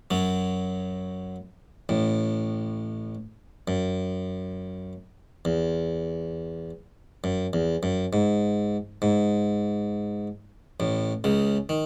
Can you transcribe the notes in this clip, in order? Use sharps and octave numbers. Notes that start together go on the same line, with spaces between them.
F#2 F#3
A1 A2
F#2
E2
F#2
E2
F#2
G#2
G#2
A1 A2
C#2 C#3
D#3